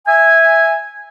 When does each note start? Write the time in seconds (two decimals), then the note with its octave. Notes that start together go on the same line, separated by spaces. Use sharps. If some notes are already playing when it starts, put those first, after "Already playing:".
0.07 E5 G#5